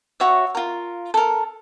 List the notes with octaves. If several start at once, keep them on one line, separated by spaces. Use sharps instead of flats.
F#4 C#5 E5
F4 A#4
A4 A#4